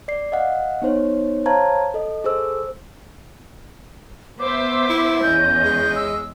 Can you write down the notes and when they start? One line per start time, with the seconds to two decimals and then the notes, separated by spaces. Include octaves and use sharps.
0.08 D5 C7
0.32 D#5 F5 F#5
0.82 B3 D#4 C5 C#5
1.46 C5 C#5 F5 A5 A#5 G#6
1.94 A4 D#5
2.24 G#4 A4 C5 E6
4.40 B3 C5 E5 D6
4.90 E4
5.23 E2 C#4 D#5 G6
5.65 G#3
5.96 E6